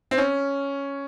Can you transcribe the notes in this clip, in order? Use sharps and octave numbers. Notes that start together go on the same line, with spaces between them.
C4
C#4